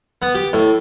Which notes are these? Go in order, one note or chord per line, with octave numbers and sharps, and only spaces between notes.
B3
G4
A2